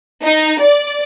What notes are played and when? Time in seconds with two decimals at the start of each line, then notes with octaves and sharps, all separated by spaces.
0.22 D#4
0.60 D5